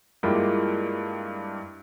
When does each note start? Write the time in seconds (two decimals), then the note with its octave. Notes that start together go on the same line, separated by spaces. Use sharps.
0.23 G2 G#3 A#3 E4 F4 G4